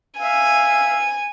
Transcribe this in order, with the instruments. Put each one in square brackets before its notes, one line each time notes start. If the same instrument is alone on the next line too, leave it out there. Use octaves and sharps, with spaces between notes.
[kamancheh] E5 F5 [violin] G#5